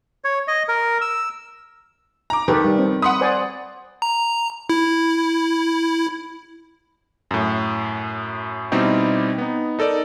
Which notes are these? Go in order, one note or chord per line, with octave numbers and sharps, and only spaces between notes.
C#5
D#5
A#4
E6
A#5 D6
D#3 G4 A4 B4
G3
C4
F#5 B5 C6 D#6
C5 D5 G#5
A#5
E4
F#2 A2
B2 G3 C4 D#4 E4 G4
B3 D#4
D#4 A4 A#4 D5